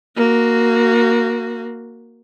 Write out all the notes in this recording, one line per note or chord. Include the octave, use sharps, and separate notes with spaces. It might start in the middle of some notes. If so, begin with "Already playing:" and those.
A#3 F#4